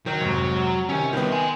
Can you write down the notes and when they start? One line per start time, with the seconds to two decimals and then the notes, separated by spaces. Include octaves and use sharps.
0.06 D#3 F#3
0.21 F1 G#2
0.89 C3 D#3 C#4
1.13 C2 D#3 B3
1.31 G#5 C6